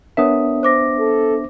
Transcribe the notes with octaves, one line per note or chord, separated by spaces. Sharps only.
B3 D4 A#4 C#5 E5 D#6
C5 D6 A#6
A4